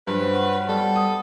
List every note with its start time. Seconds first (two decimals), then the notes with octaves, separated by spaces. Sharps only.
0.07 G2 C#3 F3 G3 B4
0.19 C#3 F#3 G4
0.69 G3 B3 A4
0.96 D#6